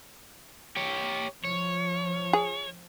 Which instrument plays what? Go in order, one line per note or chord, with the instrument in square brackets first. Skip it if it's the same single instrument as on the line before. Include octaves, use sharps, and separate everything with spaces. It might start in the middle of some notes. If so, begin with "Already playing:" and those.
[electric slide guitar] G4 C#5
[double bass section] F3 [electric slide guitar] C#5
[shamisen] G#4